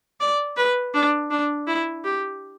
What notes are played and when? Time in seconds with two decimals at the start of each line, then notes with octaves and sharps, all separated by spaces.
0.20 D5
0.56 B4
0.94 D4
1.30 D4
1.67 E4
2.04 G4